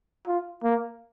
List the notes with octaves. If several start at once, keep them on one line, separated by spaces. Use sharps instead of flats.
F4
A#3